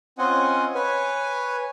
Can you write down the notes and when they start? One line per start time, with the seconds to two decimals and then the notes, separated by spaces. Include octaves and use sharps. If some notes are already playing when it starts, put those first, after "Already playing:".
0.18 C4 C#4 F4 D#5 F#5 G#5
0.75 B4 C#5 G#5